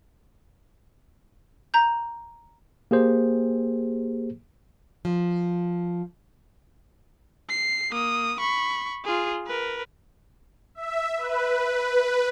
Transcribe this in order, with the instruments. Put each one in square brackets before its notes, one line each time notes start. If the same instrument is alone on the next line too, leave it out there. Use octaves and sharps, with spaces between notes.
[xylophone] A#5 G6
[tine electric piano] A#3 G4 G#4 C5
[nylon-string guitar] F3
[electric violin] C7
A#3 D#6
B5 C#6
F4 G#4
A#4 B4
[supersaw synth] E5
B4